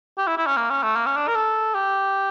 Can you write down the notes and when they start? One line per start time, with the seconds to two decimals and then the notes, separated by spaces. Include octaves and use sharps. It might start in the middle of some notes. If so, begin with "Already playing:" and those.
0.18 G4
0.27 E4
0.37 E4
0.46 C#4
0.57 A#3
0.70 C#4
0.83 A3
0.96 A#3
1.06 C#4
1.17 D4
1.28 A#4
1.35 A4
1.75 G4